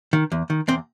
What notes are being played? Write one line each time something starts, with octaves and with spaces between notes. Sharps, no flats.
D#3
E2
D#3
E2 C4